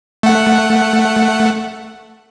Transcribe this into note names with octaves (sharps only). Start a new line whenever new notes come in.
A3 F#5